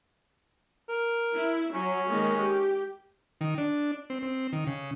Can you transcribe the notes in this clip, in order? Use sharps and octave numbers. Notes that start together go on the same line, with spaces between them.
A#4
E4
F#3 C#4
D#3 G#3 A#3
G4
D#3
D4
C4
C4
D#3
C#3